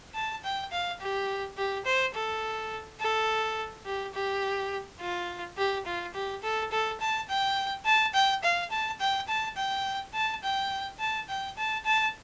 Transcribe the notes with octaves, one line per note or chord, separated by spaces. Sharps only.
A5
G5
F5
G4
G4
C5
A4
A4
G4
G4
F4
G4
F4
G4
A4
A4
A5
G5
A5
G5
F5
A5
G5
A5
G5
A5
G5
A5
G5
A5
A5